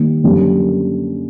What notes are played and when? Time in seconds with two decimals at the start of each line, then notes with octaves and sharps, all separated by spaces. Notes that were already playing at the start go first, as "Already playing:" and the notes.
Already playing: D#3 G3 A#3
0.24 F#2 D3 G3 A#3 C#4